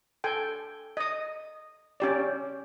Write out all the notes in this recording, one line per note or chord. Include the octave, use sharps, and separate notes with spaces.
A4 G5 G#5
D#5 D#6
C#4 G4 D5